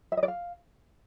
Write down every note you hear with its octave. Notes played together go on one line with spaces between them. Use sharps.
E5
D#5
D5
F5